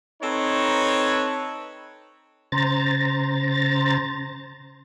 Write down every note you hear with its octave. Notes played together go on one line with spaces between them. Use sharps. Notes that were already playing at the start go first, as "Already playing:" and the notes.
C4 D#4 A4 B4 C#5
C#3 C5 A#5 A6